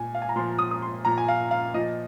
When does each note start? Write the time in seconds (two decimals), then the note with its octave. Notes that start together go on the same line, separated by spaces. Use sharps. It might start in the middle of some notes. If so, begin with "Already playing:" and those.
Already playing: A#2 G#5
0.15 F5
0.22 G#5
0.29 A#5
0.36 A#2 F3 C6
0.59 D#6
0.71 D#6
0.82 C6
1.05 A#2 F3 A#5
1.18 G#5
1.28 F5
1.51 F5
1.74 A#2 F3 D#5